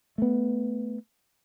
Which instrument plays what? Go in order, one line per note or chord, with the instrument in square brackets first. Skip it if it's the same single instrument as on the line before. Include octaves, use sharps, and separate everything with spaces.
[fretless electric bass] A3 B3